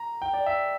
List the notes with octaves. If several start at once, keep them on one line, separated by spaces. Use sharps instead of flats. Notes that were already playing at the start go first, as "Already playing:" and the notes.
Already playing: A#5
G5
D5
E5